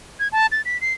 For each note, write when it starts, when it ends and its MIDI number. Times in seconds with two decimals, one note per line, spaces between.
0.20 0.28 92
0.32 0.46 81
0.52 0.62 93
0.65 0.80 95
0.81 0.93 96